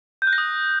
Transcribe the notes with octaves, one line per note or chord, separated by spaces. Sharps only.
G6
F#6
A#6
D#6